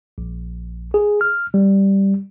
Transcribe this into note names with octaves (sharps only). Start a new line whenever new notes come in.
A#1
G#4
F6
G3